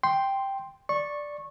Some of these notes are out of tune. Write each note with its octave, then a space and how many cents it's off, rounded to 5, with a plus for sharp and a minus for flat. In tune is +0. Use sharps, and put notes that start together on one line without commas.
G5 +0 C6 +0
D5 +0 C#6 -20